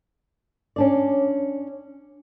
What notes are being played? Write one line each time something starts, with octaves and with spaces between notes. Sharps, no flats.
C#4 D4 D5